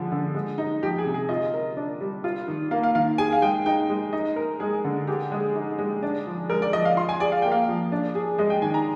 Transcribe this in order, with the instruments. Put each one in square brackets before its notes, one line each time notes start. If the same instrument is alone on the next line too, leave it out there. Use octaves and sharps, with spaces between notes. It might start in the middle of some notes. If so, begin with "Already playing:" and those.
Already playing: [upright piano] D3 F3 G#3
D3
G#3
D#4
[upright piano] F3 [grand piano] G4
[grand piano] G#4
[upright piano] C3
[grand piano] G#4
[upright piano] F4 [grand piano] D#5
[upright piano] A#4
D4
G3
F4
D#3
[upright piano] A#3 [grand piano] F5
[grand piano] F5
[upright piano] D#3 [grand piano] F5
[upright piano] G#4 [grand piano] G#5
[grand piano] F5
[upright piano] G#3 [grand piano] G5
[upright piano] D#4 [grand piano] G5
[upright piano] G#3
[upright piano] D#4 [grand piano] D#5
[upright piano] A#4
[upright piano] G#3 [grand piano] G#4
[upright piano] D3
[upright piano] G4 [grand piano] G#4
[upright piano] G#3 [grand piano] G#4
[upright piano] D#4
G#3
D4
F3
[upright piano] G#3 [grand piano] A#4
[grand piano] D5
[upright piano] F3 [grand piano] D#5
[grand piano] F5
[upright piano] F4 [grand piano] C6
[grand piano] G#5
[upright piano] G#4 [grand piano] D5
[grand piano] F5
[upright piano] A#3 [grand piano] G5
[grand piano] F5
[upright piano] F3
D4
G#4
[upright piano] G#3 [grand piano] D#5
[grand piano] G5
[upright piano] D#3 [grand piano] G#5
[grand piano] A#5